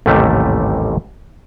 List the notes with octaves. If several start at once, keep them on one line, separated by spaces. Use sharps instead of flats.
A1 D#2 G#2 C3 G3 A3